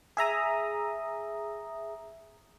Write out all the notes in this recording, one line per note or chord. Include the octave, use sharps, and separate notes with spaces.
G#4 E5 A#5 D#6